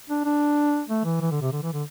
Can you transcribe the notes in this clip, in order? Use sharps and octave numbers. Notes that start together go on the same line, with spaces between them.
D4
D4
A3
E3
E3
D3
C3
D3
E3
D3